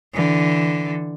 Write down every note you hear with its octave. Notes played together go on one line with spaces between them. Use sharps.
D3 E3